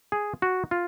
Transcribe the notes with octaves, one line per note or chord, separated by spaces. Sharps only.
G#4
F#4
F4